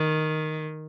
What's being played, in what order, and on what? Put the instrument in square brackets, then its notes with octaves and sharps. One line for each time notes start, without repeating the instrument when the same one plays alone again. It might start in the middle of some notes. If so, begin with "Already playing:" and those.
Already playing: [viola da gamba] D#3